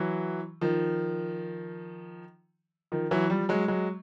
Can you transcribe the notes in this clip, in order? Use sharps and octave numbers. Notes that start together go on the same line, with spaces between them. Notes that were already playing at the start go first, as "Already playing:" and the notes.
Already playing: E3 F#3
D#3 F3
D#3 F3
E3 F#3
F3 G3
F#3 G#3
F#3 G#3